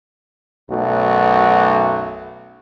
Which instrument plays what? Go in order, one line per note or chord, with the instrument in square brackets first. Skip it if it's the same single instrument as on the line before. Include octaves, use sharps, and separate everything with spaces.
[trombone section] B1 F#2 A3 F#4